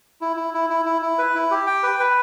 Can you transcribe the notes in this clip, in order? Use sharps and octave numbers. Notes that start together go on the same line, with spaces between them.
E4
E4
E4
E4
E4
E4
B4
E4
G4
G5
B4
B4